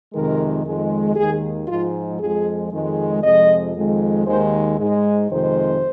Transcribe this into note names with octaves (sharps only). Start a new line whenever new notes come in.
F2 C3 D#3 G#3 A#4
F2 D#3 G#3
D#2 D#3 G#3 G#4
G#2 F3 G#3 F4
F2 F3 G#3 G#4
F2 D#3 G#3
F2 C3 F3 G#3 D#5
F2 D#3 G#3
D#2 D#3 G#3 C5
G#2 G#3
F2 C3 D#3 G#3 C5